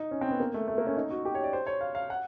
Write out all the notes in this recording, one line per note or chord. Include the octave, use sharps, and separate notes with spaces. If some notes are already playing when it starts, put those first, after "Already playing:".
Already playing: D#4
C#4
C4
B3
A#3
A3
A3
A#3
C#4
D#4
F#4
G4
C#5
D5
C5
C#5
F5
F5
F#5